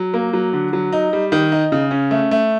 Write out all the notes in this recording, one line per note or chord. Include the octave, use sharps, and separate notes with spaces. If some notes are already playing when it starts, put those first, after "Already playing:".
Already playing: F#3
A#3
F#3
D3
F#3
D#4
G3
D#3
D#4
C#3
C#4
A3
A3